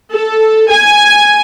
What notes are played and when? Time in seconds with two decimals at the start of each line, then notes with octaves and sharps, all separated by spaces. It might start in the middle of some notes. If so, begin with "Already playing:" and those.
0.13 A4
0.70 G#5